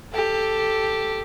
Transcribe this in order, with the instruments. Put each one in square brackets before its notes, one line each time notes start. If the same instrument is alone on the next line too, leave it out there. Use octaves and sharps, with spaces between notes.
[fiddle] G4 A4